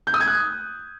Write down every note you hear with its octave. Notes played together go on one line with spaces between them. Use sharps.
G6
D#6
G#6
F#6